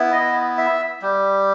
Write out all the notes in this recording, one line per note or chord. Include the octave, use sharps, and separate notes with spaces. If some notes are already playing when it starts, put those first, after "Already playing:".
Already playing: B3 E4
D#5
E5
G3